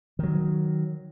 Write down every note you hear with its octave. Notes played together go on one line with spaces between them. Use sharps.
D#3 F#3